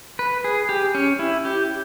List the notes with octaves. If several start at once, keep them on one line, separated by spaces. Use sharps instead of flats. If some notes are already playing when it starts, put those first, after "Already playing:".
B4
G#4
G4
C#4
E4
G4